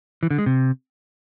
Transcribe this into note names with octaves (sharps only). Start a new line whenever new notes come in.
E3
D3
G#3
C3